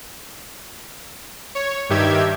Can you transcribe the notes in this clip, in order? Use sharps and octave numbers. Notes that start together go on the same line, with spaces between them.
C#5
G2 D#3 G4 E5 G#6